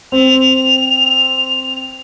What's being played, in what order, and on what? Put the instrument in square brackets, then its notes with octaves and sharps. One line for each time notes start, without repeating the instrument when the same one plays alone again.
[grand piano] C4 [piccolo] F7